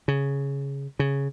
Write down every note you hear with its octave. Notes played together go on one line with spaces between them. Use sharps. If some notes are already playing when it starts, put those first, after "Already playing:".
C#3
C#3